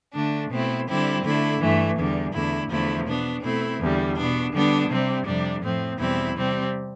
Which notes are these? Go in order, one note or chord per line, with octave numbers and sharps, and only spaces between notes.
D3 A3 D4
B2 A3 C4 E4
D3 G3 C4 E4
D3 A3 E4
G2 E3 A3
E2 D3 G3
E2 D3 A3 E4
E2 D3 F3 A3 E4
B2 B3 D4
B2 A3 C4 E4
E2 D3 G3
B2 B3 D4
D3 G3 B3 D4
C3 G3 C4
F2 C3 G3 D4
A2 F3 C4
E2 B2 G3 C4 E4
C3 G3 C4